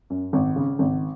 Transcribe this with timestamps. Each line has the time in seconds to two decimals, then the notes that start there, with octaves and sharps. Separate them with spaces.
0.10 F#2
0.33 G#1
0.56 C#3
0.79 G#1